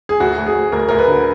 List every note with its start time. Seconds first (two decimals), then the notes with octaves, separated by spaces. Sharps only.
0.09 G#4
0.20 D2 F#4
0.38 D2
0.46 G#4
0.55 D2
0.72 D2 A#4
0.89 D2 A#4
0.99 B4
1.07 D3